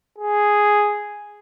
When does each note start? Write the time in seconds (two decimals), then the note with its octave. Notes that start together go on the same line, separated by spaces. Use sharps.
0.18 G#4